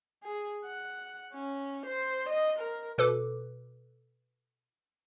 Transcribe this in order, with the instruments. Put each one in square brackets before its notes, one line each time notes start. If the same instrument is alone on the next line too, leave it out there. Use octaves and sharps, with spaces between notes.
[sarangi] G#4
F#5
C#4
C5
D#5
A#4
[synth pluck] B2 A4 B4 D6